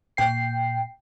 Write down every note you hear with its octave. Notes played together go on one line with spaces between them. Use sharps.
A#2 G5 C7